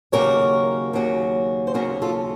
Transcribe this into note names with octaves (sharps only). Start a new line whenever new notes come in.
D#2 C#3 F#3 A#3 C#4 A#4 C#5
D#2 C#3 F#3 A#3 C#4
C5
D#2 C#3 F#3 A#3 C#4 F#4 A#4
F4 A4